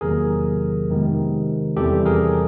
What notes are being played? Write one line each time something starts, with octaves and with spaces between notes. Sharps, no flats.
E2 C3 D#3 F#3 A#3 G#4 A#4
F2 C3 D#3 G#3 B3
E2 C3 E3 G3 G4 A4
G#4 A#4